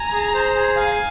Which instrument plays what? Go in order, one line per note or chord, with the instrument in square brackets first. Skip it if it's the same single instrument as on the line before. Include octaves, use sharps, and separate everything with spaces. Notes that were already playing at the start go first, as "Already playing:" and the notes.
Already playing: [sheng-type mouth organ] G#5 [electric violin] A#5
[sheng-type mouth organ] G#4
C5
G#4
[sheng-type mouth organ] F5 [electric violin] G#5